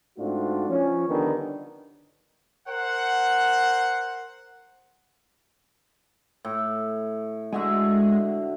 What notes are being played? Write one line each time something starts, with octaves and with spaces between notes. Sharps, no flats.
G#2 A3 C4 D4 F4 F#4
F3 C#4
D3 D#3 G3 B3
A#4 C5 F#5
A2
D3 G#3 F#4 E5